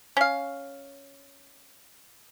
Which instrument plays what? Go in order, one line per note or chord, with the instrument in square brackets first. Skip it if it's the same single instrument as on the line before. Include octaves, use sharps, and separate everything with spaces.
[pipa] C#4 F5